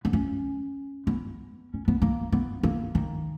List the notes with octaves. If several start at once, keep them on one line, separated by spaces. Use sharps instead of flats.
B3
C#4
B3
C#4
B3
A#3
B3
A#3
D#3